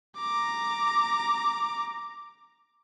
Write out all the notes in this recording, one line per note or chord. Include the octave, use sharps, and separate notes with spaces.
A#5 D6